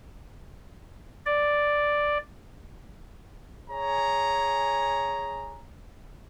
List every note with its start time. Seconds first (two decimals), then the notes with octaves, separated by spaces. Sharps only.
1.26 D5
3.70 G#4 C#5 G#5 A#5